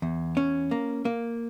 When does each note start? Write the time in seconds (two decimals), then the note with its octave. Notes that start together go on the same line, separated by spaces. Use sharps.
0.02 E2
0.37 C#4
0.71 A#3
1.05 A#3